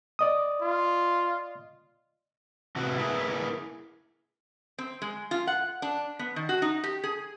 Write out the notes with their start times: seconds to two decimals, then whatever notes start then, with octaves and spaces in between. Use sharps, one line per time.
0.19 D5 D#5 D#6
0.62 F4
2.76 C3 E3 F#4
2.98 A#3 E4 G#4 B4
4.79 C4
5.02 G#3
5.31 F4
5.47 F#5
5.82 D4
6.19 B3
6.36 D#3
6.49 F#4
6.62 D#4
6.84 G4
7.04 G#4